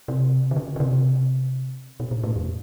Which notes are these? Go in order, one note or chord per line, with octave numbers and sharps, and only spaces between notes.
C3
D3
C#3
C#3
C3
B2
A#2
A2
F2